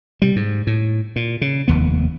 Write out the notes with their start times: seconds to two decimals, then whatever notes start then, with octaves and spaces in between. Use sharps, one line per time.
0.22 C3 G3
0.36 G#2
0.67 A2
1.16 A#2
1.41 C#3
1.68 F1 D#2 B3